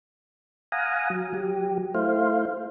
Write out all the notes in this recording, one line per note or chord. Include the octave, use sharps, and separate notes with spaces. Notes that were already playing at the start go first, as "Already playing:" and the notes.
F5 F#5 G#5 A#5 D#6
F#3
F#3 G4
A3 E4 C5 F5